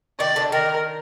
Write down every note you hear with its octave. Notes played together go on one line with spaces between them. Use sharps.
D#3 D5
D3
D#3 A#4